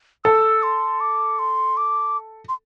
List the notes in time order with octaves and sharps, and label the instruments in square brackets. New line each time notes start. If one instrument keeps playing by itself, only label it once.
[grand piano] A4 [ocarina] E6
[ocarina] C6
D6
C6
D6
C6